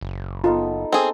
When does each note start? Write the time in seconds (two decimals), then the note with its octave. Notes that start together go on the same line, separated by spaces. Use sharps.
0.01 F#1
0.44 B3 D#4 F4 A4
0.92 C4 G#4 A4